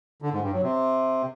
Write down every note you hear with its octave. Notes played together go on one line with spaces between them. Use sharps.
D3
G#2
G2
F#3
C3